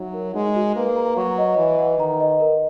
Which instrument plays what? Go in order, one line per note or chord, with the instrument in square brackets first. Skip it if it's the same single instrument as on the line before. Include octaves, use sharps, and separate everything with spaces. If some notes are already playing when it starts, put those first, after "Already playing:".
Already playing: [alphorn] F#3 [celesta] D#4 E5
[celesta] A#4
[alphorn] G#3 [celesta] D#4
[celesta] F#4
[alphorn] A#3 [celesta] B4
[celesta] A#5
[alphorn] F#3 [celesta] C#6
[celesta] D#5
[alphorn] E3 [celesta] B4
[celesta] F#5
[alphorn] D#3 [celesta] A#5
[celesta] D#5
A#4